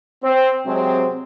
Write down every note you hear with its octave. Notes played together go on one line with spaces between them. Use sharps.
C4 C5
C3 F#3 G#3 C4